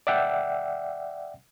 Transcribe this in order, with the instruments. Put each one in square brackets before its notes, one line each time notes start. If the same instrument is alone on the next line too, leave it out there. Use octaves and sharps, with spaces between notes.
[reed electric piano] D5 E5 F#5 G5